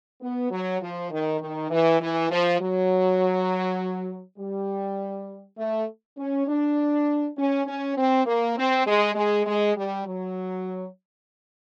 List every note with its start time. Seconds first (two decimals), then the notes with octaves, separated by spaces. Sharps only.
0.21 B3
0.51 F#3
0.80 F3
1.11 D#3
1.40 D#3
1.70 E3
2.00 E3
2.30 F3
2.60 F#3
4.38 G3
5.57 A3
6.17 C#4
6.47 D4
7.36 C#4
7.66 C#4
7.96 C4
8.25 A#3
8.56 C4
8.86 G#3
9.15 G#3
9.45 G#3
9.75 G3
10.05 F#3